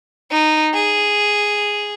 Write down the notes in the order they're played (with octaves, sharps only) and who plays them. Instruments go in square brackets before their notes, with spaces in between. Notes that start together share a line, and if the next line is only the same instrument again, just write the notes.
[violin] D#4
G#4